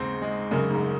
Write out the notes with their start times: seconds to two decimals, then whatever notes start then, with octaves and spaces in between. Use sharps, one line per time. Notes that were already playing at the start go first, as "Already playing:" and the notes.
Already playing: D#2 G#2 C#3 C4
0.22 G#3
0.51 F#2 C#3
0.71 G#2